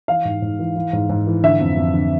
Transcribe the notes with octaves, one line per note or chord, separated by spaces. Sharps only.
E3 F5
G#2
G#2
E3
E3
G#2
G#2
E3
D3 E5
F2
F2
D3